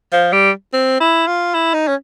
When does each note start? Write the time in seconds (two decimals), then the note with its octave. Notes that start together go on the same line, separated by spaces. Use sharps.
0.13 F3
0.33 G3
0.73 C4
1.00 E4
1.27 F4
1.54 E4
1.74 D#4
1.88 C#4